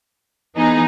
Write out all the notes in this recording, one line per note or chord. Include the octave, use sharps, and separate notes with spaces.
E3 B3 D#4 G#4